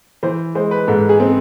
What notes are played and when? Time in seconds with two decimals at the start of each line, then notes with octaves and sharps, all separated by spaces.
0.23 E3 C5
0.55 G#3 C5
0.71 B4
0.88 G#2 A4
1.09 G#4
1.20 C4